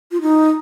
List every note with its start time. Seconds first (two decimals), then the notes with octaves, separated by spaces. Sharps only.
0.11 F4
0.21 D#4